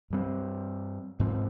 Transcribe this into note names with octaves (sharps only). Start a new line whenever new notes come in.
G2 G3 C4
G#2 F3 C4